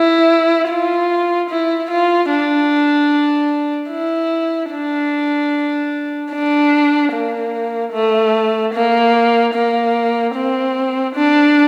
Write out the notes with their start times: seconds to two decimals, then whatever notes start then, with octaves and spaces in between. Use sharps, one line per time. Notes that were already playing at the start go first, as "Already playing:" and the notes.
Already playing: E4
0.69 F4
1.50 E4
1.90 F4
2.30 D4
3.90 E4
4.71 D4
6.32 D4
7.13 A#3
7.93 A3
8.74 A#3
9.54 A#3
10.35 C4
11.15 D4